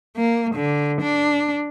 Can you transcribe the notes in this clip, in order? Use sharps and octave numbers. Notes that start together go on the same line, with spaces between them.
A#3
D3
D4